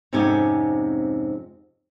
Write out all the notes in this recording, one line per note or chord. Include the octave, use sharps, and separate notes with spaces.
F2 G#2 C3 C#4 G4 G#5